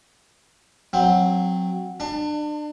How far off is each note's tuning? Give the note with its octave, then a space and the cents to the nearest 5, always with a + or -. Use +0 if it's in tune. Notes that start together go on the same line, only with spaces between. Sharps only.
F#3 -15 C4 +0
D4 +35 A5 +15